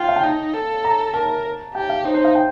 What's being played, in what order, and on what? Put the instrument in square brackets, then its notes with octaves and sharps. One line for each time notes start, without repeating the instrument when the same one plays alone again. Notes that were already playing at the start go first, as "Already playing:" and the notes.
Already playing: [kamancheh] F4 [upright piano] G5
[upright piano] F5
G5
[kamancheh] D#4 [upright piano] A5
[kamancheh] A4
[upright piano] A#5
[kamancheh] A#4 [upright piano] A5
[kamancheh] G4 [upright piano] G5
[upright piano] F5
[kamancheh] D#4 [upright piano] C5
[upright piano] C5
F5
G5